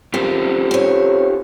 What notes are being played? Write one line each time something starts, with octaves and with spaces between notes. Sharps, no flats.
C4 F4 G4 A#4
C4 C#5